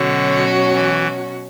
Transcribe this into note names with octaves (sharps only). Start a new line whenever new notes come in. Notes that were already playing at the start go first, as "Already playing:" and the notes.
Already playing: B2 D3 F#3 C#4 F#4
E3